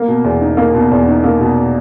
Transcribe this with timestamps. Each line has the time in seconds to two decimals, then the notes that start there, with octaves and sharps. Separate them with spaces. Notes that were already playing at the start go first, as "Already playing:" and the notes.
Already playing: A#3
0.08 B2
0.24 E2
0.41 D#4
0.57 A#3
0.74 B2
0.92 E2
1.08 D#4
1.24 A#3
1.41 B2